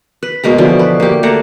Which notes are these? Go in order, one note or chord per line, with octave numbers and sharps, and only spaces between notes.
B4
B2 G#3 A#3 A#5
B2 D3 E3 F3
B4
A#3 G4
A3 A#3 F#5 A#5